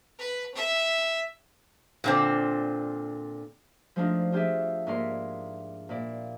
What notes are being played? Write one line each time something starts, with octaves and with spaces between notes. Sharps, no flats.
B4
E5
A#2 D3 C4
F3 G#3 A3 D4 D#4 F4
D4 F4 G4 G#4 E5
G#2 A#3 E4 A#4 D5 C6
A#2 E4 D5